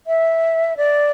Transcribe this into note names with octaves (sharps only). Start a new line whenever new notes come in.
E5
D5